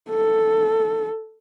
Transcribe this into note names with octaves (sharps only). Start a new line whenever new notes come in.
A4